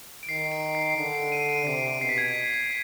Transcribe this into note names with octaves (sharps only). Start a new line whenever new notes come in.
D7
D#3 C7
D7
C7
D3 C7
D7
D#7
D7
C3 C7
B2 C7
B6
G#6